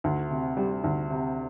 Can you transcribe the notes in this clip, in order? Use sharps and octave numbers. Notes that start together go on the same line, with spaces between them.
D2
C3
G3
D2
C3